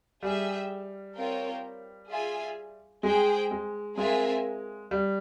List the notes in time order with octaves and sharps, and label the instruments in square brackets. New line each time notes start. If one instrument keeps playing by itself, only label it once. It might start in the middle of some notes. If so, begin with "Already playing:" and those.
[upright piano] G3 [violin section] G#4 E5 G5
[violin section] C4 F4 A#4 C#5 G5
F4 G#4 E5 G#5
[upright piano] G#3 [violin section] G#4 C5 G5
[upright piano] G#3
[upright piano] G#3 [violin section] C4 F4 A#4 E5 G#5
[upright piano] G3